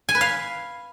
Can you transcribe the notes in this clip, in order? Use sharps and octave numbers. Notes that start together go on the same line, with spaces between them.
G#5
B4
F5